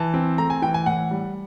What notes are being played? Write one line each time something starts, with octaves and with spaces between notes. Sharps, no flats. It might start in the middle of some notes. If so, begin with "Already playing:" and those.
Already playing: E3 A5
C4
A3 A#5
G#5
E3 G5
G#5
A2 F#5
G3